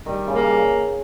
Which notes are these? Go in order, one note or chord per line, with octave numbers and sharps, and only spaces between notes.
D#3 G3
C#3
A#3